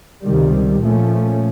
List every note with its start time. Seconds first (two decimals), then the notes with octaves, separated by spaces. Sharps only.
0.25 C#2 C3 D#3 G3
0.81 A#2 F3 A3 C#4